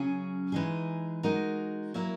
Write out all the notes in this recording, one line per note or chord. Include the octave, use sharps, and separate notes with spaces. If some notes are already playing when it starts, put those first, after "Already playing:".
Already playing: C#3 F#3 C#4 G#4
E3 G#3 D#4 G#4
G#3 D#4 F#4 A#4
F#3 A#3 E4 A#4